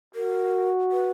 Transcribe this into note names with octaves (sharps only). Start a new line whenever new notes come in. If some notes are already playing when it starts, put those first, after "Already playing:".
F#4 A#4
B4